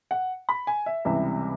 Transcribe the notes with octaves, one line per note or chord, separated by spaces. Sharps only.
F#5
B5
G#5
E5
C#2 C3 E3 G3 E5